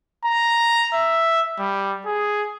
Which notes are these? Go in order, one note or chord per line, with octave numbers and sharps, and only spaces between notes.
A#5
E5
G3
G#4